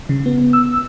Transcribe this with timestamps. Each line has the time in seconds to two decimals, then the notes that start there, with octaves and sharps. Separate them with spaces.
0.09 C#3
0.26 B3
0.53 E6